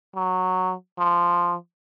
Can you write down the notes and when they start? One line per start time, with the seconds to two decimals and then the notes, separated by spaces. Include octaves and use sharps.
0.16 F#3
0.98 F3